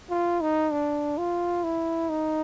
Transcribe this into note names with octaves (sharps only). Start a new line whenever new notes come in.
F4
D#4
D4
F4
E4
D#4